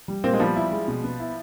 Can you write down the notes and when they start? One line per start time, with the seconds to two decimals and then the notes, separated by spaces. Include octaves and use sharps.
0.08 G3
0.24 A#2 A#3 C4
0.34 G#3
0.40 F3 G3 B3
0.56 E4
0.71 G#3
0.88 B2
1.04 B3
1.20 E4